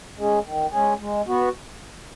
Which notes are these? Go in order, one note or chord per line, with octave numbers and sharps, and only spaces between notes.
G#3 C#4 G#4
D#3
G#3 C#4 G#4
G#3
B3 F#4